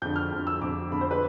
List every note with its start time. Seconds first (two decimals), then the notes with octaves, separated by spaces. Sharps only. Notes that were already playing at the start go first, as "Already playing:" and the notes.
0.02 F2 D3 G6
0.16 F6
0.31 F2 D3
0.47 E6
0.61 F2 D3 D6
0.91 F2 D3 B5
1.01 C5
1.11 B4